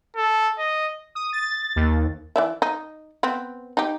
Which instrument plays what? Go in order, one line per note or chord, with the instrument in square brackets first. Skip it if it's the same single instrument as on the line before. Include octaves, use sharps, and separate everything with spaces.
[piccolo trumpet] A4
D#5
[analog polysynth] D#6
A6
D#2
[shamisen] E3 D5 E5
D#4
B3 C4
D#4 G4